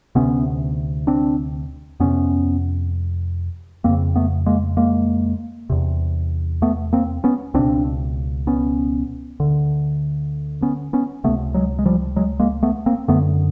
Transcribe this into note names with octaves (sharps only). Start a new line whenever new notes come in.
D2 C3 B3 C#4
C4 D4
F2 C3 B3 C#4
F2 C#3 A#3 C4
A3 B3
G#3 A#3
G#3 A#3
E2 C3
A3 B3
A#3 C4
B3 C#4
C#2 B2 C4 D4
B3 C#4
D2 D3
B3 C#4
B3 C#4
C#2 C3 A3 B3
F#3 G#3
G#3
F3 G3
F#3 G#3
G#3 A#3
A3 B3
A#3 C4
F#2 D3 A3 B3